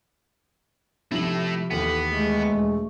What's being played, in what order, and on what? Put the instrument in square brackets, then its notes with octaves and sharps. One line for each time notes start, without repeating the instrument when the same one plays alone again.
[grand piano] C3 F3 F#7 [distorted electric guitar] A3 E4
[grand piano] D#2 E3 [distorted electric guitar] B3 [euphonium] A4
[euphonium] G#3 [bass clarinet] A3
[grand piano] E1